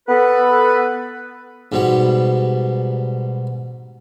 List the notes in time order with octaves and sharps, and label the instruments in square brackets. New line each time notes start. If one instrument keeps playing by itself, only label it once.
[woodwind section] B3 A4 B4
[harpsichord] G#2 B2 G3